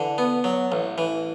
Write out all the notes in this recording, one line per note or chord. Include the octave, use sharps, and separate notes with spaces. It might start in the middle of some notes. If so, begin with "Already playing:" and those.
Already playing: D3 E3
B3
F#3
A1
E3